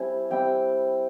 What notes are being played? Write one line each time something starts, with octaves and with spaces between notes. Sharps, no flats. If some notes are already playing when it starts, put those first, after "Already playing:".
Already playing: G3 C4 E4 G#5
G3 C4 E4 G5